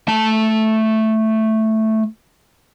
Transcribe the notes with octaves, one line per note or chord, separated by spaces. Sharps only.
A3 A5